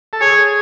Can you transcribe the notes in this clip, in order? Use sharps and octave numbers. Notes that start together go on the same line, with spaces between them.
A4
G#4 C#5